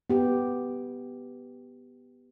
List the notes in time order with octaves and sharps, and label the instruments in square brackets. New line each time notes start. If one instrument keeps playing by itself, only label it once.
[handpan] B3 G4